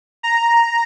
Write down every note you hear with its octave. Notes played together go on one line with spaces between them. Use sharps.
A#5